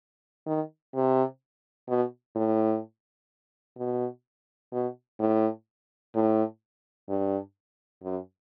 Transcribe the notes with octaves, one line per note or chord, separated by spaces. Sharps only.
D#3
C3
B2
A2
B2
B2
A2
A2
G2
F#2